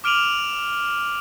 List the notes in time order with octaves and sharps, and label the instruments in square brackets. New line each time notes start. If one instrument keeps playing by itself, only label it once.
[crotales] D6 F6 D7 D#7 F7 F#7